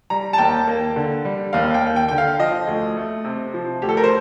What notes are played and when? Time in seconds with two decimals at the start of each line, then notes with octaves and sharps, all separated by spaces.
0.10 G3 A#5
0.33 A5
0.38 D#2 G5
0.67 A#3
0.96 D3
1.25 G3
1.53 D#2 F5
1.74 G5
1.81 A#3
1.96 G5
2.09 D3 G5
2.18 F5
2.39 F3 D#5
2.67 D2
2.97 A3
3.25 C3
3.54 F3
3.82 D2 G4
3.89 A4
3.97 A#4
4.04 C5